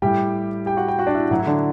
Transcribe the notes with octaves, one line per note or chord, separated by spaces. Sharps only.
A2 G3 G4 G5
G4 G5
F#4 F#5
G4 G5
F#4 F#5
D4 D5
E4 E5
A2 F#3 F#4
E4
D3 D4